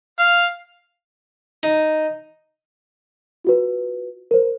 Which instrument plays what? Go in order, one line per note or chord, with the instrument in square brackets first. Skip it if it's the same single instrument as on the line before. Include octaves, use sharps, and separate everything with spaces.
[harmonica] F5
[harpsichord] D#4
[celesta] F4 F#4 B4
A#4 C5